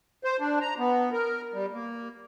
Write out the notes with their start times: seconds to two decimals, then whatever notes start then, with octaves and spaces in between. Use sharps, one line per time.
0.24 C5
0.40 D4
0.61 A#5
0.79 B3
1.12 A#4
1.54 G3
1.73 A#3